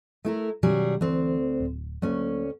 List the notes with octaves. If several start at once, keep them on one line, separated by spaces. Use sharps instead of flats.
A3 E4 A#4
B2 D#3 F#3 G3 C#4 G#4
D2 E3 C4
D1
D2 F#3 A#3 C#4